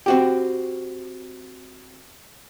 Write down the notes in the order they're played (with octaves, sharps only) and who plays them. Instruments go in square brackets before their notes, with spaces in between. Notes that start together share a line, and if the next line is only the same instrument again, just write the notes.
[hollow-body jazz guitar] C4 F#4 G4